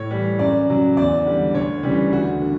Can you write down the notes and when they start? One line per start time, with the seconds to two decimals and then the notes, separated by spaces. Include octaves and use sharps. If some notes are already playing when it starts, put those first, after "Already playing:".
Already playing: A2 C#5
0.10 E3 G3
0.39 F#2 D5
0.68 C#3 F#3
0.97 E2 D5
1.26 D3 G3
1.54 D2 C#5
1.83 C#3 E3 G3
2.12 D2 F#4
2.41 D3